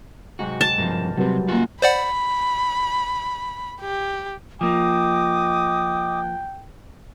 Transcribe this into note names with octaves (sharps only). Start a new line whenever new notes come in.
G#2 C3 F#3 F#4
A5
E2 G2 F3 A#4
C3 F#3 G3 C4 B4
F#2 C#3 A#3 F4 F#5
C5 D5 F#5 B5
G4
F3 A#3 D#5 G5 D6 D#6